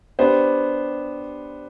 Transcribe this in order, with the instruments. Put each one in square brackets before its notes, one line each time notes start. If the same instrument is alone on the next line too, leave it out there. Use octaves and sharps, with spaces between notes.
[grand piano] B3 D4 G4 C5